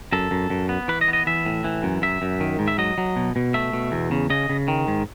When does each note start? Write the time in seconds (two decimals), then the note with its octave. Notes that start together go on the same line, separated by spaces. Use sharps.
0.13 F#2 A4
0.31 F#2
0.50 F#2
0.69 B3
0.88 E3 B4
1.01 D#5
1.08 B3
1.13 D#5
1.26 E3 E5
1.46 A2
1.64 E3
1.83 F#2
2.02 F#2 E5
2.22 F#2
2.41 D#3
2.59 G#2
2.68 E5
2.78 F#3 D#5
2.98 F#3
3.16 B2
3.36 B2
3.54 A3 E5
3.73 B2
3.92 E2
4.11 C#3
4.30 C#3 D#5
4.49 C#3
4.68 D#3
4.88 G#2